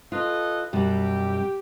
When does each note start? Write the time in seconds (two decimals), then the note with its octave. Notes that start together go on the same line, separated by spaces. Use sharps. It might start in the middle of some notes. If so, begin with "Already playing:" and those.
0.12 F4 A4 B4 D#5
0.73 F#2 B2 G3 G4